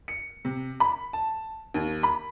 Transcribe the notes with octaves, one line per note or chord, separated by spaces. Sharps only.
C#7
C3
B5
A5
D#2
B5